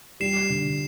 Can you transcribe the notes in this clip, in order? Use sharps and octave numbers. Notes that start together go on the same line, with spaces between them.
G3 C7 E7
D3